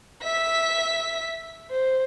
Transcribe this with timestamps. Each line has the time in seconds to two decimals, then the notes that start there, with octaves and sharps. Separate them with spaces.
0.23 E5 B6
1.71 C5